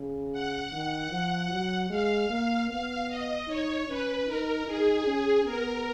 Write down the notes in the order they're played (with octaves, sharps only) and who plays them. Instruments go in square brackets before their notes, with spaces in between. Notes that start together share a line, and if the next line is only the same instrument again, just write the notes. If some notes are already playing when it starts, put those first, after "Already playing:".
Already playing: [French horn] C#3
[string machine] F#5
[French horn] D#3
F3
F#3
[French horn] G#3 [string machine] F5
[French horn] A#3
[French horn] B3 [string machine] F5
[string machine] D#5
[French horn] D#4 [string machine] C#5
[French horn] C#4 [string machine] B4
[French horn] D#4 [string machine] A#4
[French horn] D#4 [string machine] G#4
[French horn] C#4
[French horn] B3 [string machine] A#4